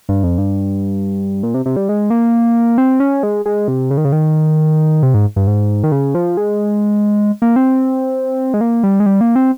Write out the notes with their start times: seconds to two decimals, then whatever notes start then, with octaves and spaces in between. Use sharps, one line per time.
0.09 G2
0.24 F2
0.38 G2
1.43 A#2
1.54 C3
1.66 C3
1.77 G3
1.89 G#3
2.10 A#3
2.78 C4
3.00 C#4
3.23 G#3
3.46 G#3
3.68 C3
3.91 C#3
3.97 D#3
4.05 C#3
4.12 D#3
5.03 C3
5.14 G#2
5.36 G2
5.47 G#2
5.84 D#3
5.92 C#3
6.15 F3
6.37 G#3
7.42 A#3
7.56 C4
8.54 G#3
8.61 A#3
8.83 G3
9.00 G#3
9.06 G3
9.21 A#3
9.36 C4